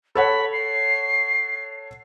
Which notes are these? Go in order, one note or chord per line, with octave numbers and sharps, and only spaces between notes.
A4 C#5 F#5 B5
C7